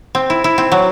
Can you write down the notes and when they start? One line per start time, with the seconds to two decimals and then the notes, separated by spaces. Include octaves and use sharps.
0.15 C4
0.30 E4
0.44 E4
0.58 C4
0.72 F#3